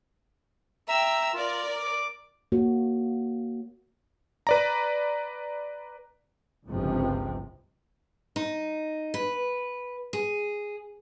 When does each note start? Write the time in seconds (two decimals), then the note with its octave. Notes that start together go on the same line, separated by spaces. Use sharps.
0.88 E5 G5 A#5 E6
1.33 F4 A#4 D5
1.76 D6
2.52 A#3 F#4 C#5
4.47 B4 D5 A#5
6.68 G1 C#2 G#2 C3 F3
8.36 D#4
9.14 B4
10.13 G#4